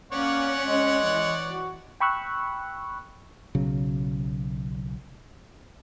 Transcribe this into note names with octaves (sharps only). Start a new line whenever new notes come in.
A#3 C#4 C#5 D5 F#5
G#3
E3
F#4
G5 B5 C#6 E6 F#6
B1 C#3 F#3